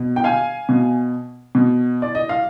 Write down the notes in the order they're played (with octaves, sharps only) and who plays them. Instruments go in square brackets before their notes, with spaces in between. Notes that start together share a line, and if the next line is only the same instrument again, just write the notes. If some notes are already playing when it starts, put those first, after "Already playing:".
Already playing: [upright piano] B2
G5
F5 G#5
B2
B2
D5
D#5
F5